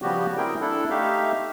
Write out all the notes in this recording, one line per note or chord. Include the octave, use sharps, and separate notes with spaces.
C#3 F3 G3 B3 F#4 G4
C4 E4 G#4 A#4 G5
D4 E4 A4
A3 D#4 G4 E5 F5